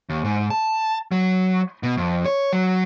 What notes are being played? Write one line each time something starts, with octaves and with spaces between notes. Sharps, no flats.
D#2
G#2
A5
F#3
B2
F2
C#5
F#3